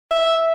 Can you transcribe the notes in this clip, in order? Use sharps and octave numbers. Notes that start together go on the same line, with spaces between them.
E5